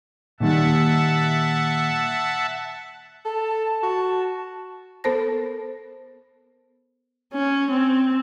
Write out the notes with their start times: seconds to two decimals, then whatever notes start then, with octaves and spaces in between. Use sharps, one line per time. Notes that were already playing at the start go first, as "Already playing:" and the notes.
0.40 A#2 D#3 G3 E5 F#5 A5
3.25 A4 A5
3.83 F#4
5.04 B3 A4 A#4 C5 A5 A#6
7.33 C#4
7.71 C4